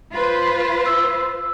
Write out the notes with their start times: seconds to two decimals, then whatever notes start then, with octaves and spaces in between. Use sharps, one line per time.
0.13 F4 B4 C5
0.86 E6